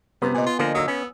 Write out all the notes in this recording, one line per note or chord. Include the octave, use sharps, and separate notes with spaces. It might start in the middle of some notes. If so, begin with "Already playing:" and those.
F#2 C3 G3 B3 B5
A#2 D#5 G#5
F4
D3 F3 A#3
F#3 D#6 E6
B3 C#4